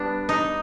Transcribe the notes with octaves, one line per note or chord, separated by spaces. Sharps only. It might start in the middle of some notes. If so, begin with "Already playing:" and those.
Already playing: G3 B3 D4
D#4